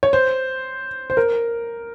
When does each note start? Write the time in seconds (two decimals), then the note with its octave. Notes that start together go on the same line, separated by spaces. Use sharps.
0.03 C#5
0.13 C5
1.10 C5
1.17 A#4